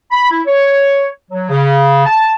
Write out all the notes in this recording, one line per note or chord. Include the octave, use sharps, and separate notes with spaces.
B5
E4
C#5
F#3
C#3
A5